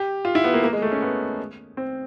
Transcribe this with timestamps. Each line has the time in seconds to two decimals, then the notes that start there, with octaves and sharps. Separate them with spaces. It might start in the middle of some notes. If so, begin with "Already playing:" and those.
Already playing: G4
0.25 F4
0.35 E4
0.44 B3
0.54 A#3
0.64 A#3
0.73 G#3
0.82 A3
0.92 C#4
1.02 B3
1.77 C4